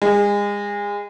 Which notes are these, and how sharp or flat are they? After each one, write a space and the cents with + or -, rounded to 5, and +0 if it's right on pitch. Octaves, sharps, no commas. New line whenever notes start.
G#3 -30